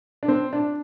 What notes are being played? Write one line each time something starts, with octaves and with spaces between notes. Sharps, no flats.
D4
C4
D4